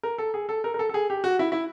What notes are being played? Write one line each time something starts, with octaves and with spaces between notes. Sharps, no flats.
A#4
A4
G#4
A4
A#4
A#4
A4
A4
G#4
G4
F#4
E4
E4